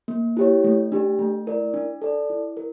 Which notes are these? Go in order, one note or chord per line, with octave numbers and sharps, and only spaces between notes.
A#3
E4 G4 C#5
A3
D4 G4
A3
E4 A#4 D5
D4
A4 D5
E4
A#4